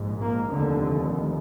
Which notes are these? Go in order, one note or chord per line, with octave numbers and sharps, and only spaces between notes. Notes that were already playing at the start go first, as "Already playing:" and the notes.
Already playing: A#1 G#2
A#3
F1 D#2 D3